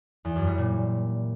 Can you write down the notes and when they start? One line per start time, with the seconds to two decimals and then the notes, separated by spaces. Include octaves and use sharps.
0.25 E2
0.36 F#2
0.47 G3
0.58 A#2